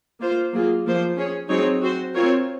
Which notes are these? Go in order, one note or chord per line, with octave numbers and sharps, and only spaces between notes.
A#3 F4 C5
F#3 A#3 F4 G#4
F3 A#3 F4 C5
C#4 G#4 C#5
F#3 C4 D#4 G#4 C#5
C4 F#4 C5
C4 F4 A#4 C#5